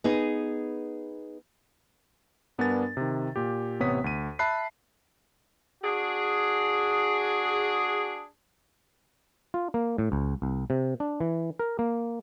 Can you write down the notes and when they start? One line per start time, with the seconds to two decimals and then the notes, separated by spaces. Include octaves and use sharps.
0.04 B3 D#4 G#4
2.58 G2 B3 D4 A#4 G#5 A6
2.97 C3 D#3
3.36 A#2 G4
3.80 A1 C3 B3 C#5 D#6 B6
4.04 D2 D#7
4.39 E5 A5 B5 F#6 C7
5.83 D4 F#4 G#4
9.54 F4
9.74 A#3
9.98 A2
10.12 C#2
10.42 C2
10.70 C3
11.00 D4
11.21 E3
11.59 A#4
11.79 A#3